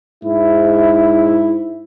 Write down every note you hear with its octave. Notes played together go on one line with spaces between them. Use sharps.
G#2 E4